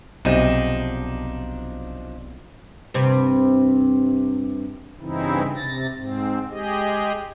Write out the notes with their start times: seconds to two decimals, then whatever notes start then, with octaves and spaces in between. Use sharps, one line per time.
0.25 B1 C3 F3 D4 D#4
2.94 G2 C3
5.01 G2 C#3 E3 C4 D#4 E4
5.55 C3 A6 A#6
5.95 G#2 C4
6.50 G#3 G4 G#4 D#5